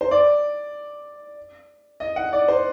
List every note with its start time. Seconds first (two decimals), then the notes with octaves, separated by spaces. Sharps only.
0.01 C5
0.11 D5
2.00 D#5
2.16 F#5
2.33 D5
2.48 C5